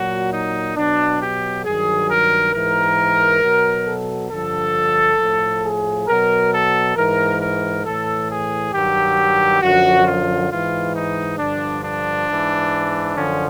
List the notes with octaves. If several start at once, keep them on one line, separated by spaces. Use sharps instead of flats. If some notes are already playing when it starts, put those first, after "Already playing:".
Already playing: A#2 F#3 F#4
D#4
B2 F#3 D4
G4
G2 D#3 F#3 G#4
A#4
G#2 E3 A#4
B2 F#3
A4
G2 D3 F3 A4
A2 F3
G#4
B2 F#3 A#4
A4
G#2 E3 A#4
A#4
A2 E3 A4
G#4
G2 D#3 F#3 G4
F#2 D3 F3 F#4
F4
G#2 E3 F4
D#4
G2 D3 F3 D4
D4
G#2 E3
F#2 D3 F3 C#4